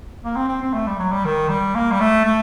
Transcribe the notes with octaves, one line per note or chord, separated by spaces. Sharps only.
A#3
C4
C4
C4
A3
G3
F#3
G3
D#3
G3
A#3
G3
A3
A3